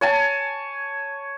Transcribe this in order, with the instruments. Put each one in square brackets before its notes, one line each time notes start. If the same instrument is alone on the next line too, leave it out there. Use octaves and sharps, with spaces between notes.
[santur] C#5 G#5 A5